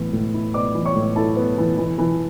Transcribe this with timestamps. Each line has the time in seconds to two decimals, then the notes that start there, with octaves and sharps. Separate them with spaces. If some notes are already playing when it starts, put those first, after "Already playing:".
Already playing: A2 E3 B3 E4
0.13 A2
0.34 E4
0.54 B3 D5 D6
0.75 E3
0.85 C#5 C#6
0.95 A2
1.16 E4 A4 A5
1.37 B3
1.58 E3
1.78 E3
1.98 E3